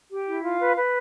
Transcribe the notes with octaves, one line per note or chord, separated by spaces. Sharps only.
G4
E4
F4 F5
B4
B4